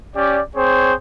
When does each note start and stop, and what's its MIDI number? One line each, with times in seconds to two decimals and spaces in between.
0.15 0.40 61
0.15 0.40 67
0.15 0.40 74
0.55 0.94 60
0.55 0.94 68
0.55 0.94 72
0.55 0.94 73